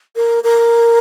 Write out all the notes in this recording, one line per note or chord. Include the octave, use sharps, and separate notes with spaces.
A#4
A#4